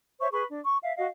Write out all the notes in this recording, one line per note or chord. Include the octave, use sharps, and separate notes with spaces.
C5 C#5 E5 C#6
G#4 B4 B5 C#6
D4
C#6
E5 F5
F#4 D#5 F5